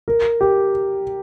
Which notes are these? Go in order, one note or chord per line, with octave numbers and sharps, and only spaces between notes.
A#4
G4